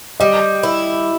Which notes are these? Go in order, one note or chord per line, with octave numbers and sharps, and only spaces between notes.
G3 D#5
E4